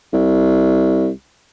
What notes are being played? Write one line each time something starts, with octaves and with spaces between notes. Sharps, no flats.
C2